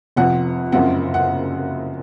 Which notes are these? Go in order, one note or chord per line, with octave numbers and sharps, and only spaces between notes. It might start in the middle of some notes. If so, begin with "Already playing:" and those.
F1 F2 C3 F3 F#5
F#1 F#2 C#3 F3 C4 F#5
F#5